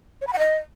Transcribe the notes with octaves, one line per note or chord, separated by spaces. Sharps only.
C#5
B5
F#5
D#5